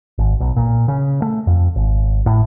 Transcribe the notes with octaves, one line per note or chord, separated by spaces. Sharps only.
G#1
B1
A#2
C#3
A3
F2
G#1
A2